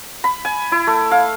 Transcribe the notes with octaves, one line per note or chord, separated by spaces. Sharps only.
B5
G#5
E4
A3
F5